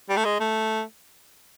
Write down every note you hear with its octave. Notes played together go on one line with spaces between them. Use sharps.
G3
A3
G#3
A3